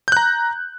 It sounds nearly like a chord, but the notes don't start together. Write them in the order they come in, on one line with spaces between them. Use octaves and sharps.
G6 F#6 A#5